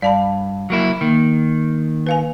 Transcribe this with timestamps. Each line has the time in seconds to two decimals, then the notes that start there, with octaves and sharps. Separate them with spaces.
0.02 G2 D5 F5 A5 B5
0.70 F#3 A#3 E4
1.01 D#3 A#3
2.07 B4 F5 G#5